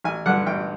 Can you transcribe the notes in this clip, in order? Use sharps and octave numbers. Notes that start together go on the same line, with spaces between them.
A1 G#5
G2 D3 F#5
A1 G5